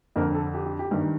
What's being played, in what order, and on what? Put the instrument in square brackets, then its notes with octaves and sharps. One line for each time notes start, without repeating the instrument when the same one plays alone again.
[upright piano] F2 D3 A#4
A4
G4
G4
G4
G2 D#3 G4